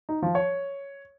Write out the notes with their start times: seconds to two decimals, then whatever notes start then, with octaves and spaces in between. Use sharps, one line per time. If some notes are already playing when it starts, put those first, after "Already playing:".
0.09 D#4
0.22 F3
0.35 C#5